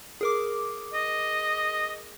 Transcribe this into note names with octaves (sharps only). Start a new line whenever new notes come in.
G#4 A#4 D6
D#5